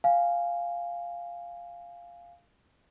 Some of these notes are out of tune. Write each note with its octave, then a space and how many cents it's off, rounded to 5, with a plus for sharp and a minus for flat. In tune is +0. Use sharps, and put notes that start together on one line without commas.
F5 +0 G#5 +0